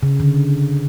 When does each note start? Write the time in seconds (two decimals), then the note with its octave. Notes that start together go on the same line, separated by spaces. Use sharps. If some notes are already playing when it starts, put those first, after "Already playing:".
0.03 C#3
0.20 D3